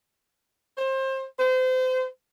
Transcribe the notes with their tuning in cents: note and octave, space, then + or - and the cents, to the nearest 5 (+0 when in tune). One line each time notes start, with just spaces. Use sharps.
C5 +30
C5 -30